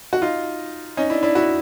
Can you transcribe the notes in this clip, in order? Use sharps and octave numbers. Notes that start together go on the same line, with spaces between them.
F#4
D#4 F4
C#4 D#4
D4 E4
D4 E4
E4 F#4